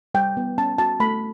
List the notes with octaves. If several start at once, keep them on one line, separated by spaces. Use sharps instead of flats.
G3 G5
B3
C#4 A5
F#4 A5
A3 B5